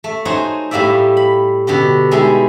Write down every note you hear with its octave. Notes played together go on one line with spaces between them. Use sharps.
A3
D#4 F#4 C5 C#5 G#5
A2 G3 A#3 D5 E5
B5
B2 D3 G4
G3 G#3 D#4 E4